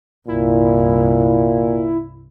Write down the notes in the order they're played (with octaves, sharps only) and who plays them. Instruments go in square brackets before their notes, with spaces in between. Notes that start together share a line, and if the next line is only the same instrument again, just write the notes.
[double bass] C2 G2 [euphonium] A#2 [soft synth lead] E4